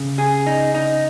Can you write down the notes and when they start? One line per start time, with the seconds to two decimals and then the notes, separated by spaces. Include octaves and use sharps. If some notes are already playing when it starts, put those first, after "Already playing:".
Already playing: C#3
0.18 G#4
0.46 D#4
0.74 D#4